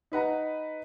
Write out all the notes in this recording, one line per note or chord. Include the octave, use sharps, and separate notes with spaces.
D#4 B4 F#5 A#5